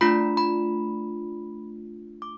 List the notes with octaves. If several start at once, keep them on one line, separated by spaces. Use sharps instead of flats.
A3 D4 F4 B5
B5
D6